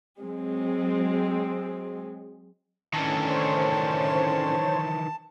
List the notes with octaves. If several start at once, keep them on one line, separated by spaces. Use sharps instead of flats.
F#3 G#3 C4
A2 D#3 E3 C#4 D4 A5
C5 C#5